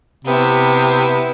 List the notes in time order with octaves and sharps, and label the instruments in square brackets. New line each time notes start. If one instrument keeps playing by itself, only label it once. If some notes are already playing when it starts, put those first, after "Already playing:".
[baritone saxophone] C3 [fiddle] B3 E4